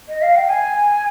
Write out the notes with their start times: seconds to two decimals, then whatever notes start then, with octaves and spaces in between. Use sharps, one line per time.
0.08 D#5
0.22 F5
0.36 G5
0.49 G#5